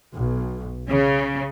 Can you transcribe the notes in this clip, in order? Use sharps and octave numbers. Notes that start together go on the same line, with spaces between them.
B1
C#3